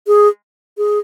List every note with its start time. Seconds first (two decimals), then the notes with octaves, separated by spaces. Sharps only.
0.07 G#4
0.78 G#4